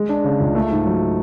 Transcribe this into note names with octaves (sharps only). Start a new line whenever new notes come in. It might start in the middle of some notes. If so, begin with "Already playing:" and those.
Already playing: G#3
D4
C#3
C#2
A3
G#2
F#3